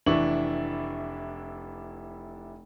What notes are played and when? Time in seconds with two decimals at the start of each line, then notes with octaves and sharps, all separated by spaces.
0.06 F1 E3 D4 E4 C#6 F#7